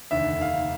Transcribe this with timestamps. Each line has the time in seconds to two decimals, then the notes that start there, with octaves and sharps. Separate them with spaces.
0.11 F1 D#2 D3 E5
0.41 F5